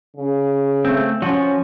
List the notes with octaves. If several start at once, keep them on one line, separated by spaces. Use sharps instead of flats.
C#3
A3 C4
F3 C#4 F#4